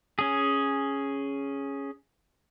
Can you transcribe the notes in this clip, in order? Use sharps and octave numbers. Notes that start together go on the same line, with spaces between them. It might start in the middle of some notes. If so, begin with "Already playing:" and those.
C#4 G#4